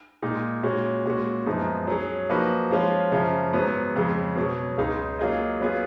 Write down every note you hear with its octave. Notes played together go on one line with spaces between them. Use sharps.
A#2 G#3 D#4
A#2 G#3 C#4 F#4
A#2 G#3 C#4 F#4
F#2 F3 G#3 B3 D#4
F#3 C#4 G#4
F3 A#3 D#4 F#4 B4
F3 G#3 C#4 F4
F#2 C#3 F3
G#2 F#3 B3
F2 C#3 G#3
B2 F#3 C#4
C#2 C#3 G#3 D#4 G#4
F#3 A#3 F4 G#4 D#5
F#3 B3 F4 G#4